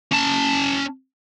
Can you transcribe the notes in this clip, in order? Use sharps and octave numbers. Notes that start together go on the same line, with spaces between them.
C#4 A5